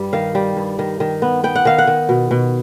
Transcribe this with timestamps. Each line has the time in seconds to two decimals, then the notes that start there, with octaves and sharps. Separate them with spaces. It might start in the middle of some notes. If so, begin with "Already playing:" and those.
Already playing: G2 G3
0.13 D#3 F5
0.35 G3
0.57 G2
0.79 D#3
1.00 D#3
1.22 B3
1.44 B3 G5
1.55 F#5
1.65 D#3 F5
1.78 F#5
1.87 D#3
2.09 B2
2.31 B2